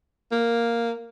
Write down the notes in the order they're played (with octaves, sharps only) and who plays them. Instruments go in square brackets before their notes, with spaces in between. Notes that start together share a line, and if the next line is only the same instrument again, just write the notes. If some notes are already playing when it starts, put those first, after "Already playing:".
[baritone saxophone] A#3